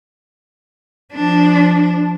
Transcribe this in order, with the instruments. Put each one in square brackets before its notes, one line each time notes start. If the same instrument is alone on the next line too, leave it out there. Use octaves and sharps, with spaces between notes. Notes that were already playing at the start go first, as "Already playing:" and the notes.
[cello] F3 D4